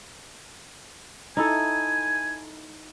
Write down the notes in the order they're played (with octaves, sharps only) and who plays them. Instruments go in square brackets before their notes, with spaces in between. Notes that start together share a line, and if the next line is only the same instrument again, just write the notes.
[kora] D#4 E4 A4 [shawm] G#5